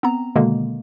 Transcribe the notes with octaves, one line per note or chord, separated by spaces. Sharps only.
B3 C4 A#5
B2 D3 D#3 G#3 A#3